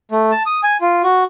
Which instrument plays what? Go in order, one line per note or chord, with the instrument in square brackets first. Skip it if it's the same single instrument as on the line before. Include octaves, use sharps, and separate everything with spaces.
[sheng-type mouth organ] A3
A5
D#6
G#5
F4
F#4